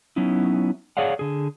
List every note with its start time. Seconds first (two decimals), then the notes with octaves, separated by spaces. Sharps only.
0.16 F#3 B3 C#4 D#4 E4
0.97 G#4 C#5 D5 F5 F#5
1.19 D3 G#4